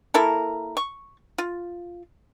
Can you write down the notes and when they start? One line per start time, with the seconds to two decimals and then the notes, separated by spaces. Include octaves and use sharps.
0.14 A#3 E4 A4 A#4
0.77 C#6
1.38 F4